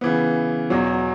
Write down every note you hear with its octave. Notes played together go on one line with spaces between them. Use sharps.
C#3 E3 B3
E2 B2 F#3